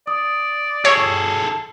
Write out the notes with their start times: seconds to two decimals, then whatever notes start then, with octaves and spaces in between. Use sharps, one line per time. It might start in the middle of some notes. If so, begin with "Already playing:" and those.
0.07 D5 D#6
0.85 G#4 A4 C#5